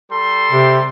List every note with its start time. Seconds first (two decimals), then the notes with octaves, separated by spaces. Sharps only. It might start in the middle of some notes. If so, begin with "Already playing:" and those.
0.10 G3 A4 C6
0.52 C3